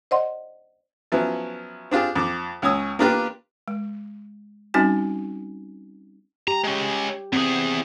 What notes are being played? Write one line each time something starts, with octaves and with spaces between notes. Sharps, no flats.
C5 D5 D#5 F#5 C6
F3 F#3 B3 C#4 E4
C4 D4 F4 G4 G#4
F2 D6
C#2 C#4 C#5 D#6 E6
A#3 B3 D4 F4 G4 B4
G#3
G3 C4 C#4 D#4 F#4 G#5
G4 A#5
G#3 C#4
E2 C4 G#4